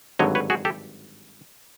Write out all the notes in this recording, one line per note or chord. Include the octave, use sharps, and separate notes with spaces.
G#1 G2 D3 F#3 C#5 D#5
B4 C#5
F#4 G#4
G4 A4